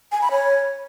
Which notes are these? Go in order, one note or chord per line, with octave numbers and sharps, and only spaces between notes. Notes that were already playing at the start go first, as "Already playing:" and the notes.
G#5
B5
C#5